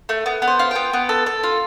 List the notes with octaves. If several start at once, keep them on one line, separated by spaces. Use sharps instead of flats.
A3
B3
B3
C5
F4
B3 G5
B3
A4
A4
F4